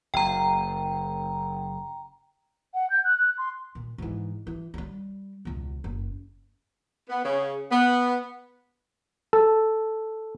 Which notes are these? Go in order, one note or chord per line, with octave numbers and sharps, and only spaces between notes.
F#1 G5 A#5
F#5
G6
F#6
F#6
C6
A#2
G#2 E3
E3
F#3 G3
E1 C#2
F#1
B3
C#3
B3
A4